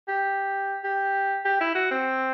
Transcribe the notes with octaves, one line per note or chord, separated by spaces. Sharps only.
G4
G4
G4
E4
F#4
C4